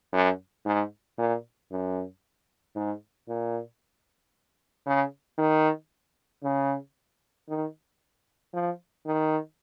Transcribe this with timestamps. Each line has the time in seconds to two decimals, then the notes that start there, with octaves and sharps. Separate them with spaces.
0.13 F#2
0.66 G#2
1.18 A#2
1.71 F#2
2.76 G#2
3.28 A#2
4.86 C#3
5.38 D#3
6.43 C#3
7.49 D#3
8.54 F3
9.06 D#3